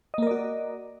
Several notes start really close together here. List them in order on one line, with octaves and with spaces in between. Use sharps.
D#5 A#3 A#4 D5 F#4